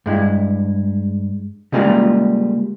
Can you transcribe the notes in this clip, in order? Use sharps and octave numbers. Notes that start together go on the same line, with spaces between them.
G2 G#3 E4
C#3 G3 G#3 A#3 F4